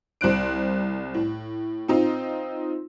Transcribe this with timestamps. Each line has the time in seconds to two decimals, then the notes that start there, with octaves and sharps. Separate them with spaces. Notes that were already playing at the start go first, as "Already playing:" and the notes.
0.21 C2 C5 F#6 D7
1.14 A2
1.88 C4 D#4 F4